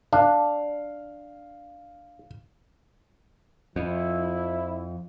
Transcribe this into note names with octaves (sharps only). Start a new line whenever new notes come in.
D4 F5
F2 F3 E4